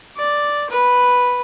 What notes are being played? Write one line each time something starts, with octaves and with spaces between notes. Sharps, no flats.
D5
B4